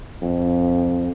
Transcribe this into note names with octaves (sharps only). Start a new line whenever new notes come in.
F2